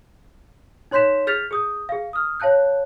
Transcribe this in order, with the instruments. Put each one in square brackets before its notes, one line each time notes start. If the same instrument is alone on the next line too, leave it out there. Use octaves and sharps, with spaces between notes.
[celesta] D#4 C#5 C6 G6 B6 E7
G#4 F6 G6 A6 B6 F7
G#4 D#6 G6
G#4 F5
D#6 F6
C#5 F5 A5 F#6 G6